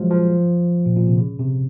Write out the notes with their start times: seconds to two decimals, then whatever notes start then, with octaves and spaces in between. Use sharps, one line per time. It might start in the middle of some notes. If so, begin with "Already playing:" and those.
Already playing: F3 F#3 G#3
0.10 F3
0.86 A#2
0.96 A#2
1.07 C3
1.18 C#3
1.39 C3